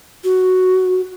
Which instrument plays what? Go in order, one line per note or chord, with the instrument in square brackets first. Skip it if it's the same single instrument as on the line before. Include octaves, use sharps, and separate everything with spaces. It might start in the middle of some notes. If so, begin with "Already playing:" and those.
[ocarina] F#4